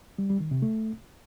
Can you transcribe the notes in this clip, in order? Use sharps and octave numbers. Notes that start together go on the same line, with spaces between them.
G3
G3
D#3
C3
A3